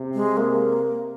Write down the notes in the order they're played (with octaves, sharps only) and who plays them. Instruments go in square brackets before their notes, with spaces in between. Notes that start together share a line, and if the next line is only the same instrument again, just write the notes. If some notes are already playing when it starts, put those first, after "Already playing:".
Already playing: [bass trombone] C3
[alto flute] G#3
A#3